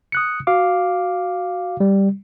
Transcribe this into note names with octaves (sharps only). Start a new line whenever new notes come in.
D#6 F#6 C#7
F#4 F5 D6
G3